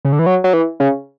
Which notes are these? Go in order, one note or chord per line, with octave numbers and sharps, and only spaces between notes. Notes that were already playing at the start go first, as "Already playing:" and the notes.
C#3
D3
E3
F#3
F#3
E3
C#3